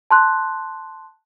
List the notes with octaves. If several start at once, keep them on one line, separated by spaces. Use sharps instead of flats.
A5 C6 F#6